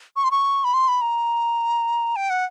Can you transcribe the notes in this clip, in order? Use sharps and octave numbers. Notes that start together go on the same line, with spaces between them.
C#6
C6
C#6
B5
C6
B5
A#5
G5
F#5